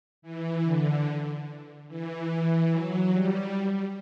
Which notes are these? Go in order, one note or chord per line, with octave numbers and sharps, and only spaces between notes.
E3
D3
E3
F#3
G3